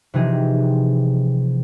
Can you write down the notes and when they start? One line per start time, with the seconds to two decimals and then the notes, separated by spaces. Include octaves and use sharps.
0.14 C3 E3 F3 D#4 G4 G#4